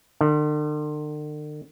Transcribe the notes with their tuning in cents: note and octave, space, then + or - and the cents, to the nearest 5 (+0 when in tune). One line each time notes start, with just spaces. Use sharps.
D3 +45